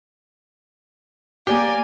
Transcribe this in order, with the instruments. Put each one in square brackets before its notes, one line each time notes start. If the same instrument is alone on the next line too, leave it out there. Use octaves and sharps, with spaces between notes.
[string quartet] A#3 D5 G#5 [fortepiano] G4